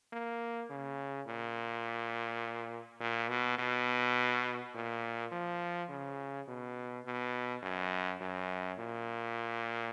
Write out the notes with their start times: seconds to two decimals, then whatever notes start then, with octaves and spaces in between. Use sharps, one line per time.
0.13 A#3
0.70 C#3
1.27 A#2
3.00 A#2
3.29 B2
3.59 B2
4.75 A#2
5.32 F3
5.89 C#3
6.48 B2
7.05 B2
7.63 F#2
8.21 F#2
8.79 A#2